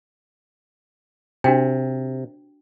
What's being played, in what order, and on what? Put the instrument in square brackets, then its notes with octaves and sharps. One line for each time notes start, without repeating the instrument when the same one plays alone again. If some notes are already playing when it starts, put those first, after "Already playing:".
[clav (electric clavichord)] C3 [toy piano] D4 F#4 G5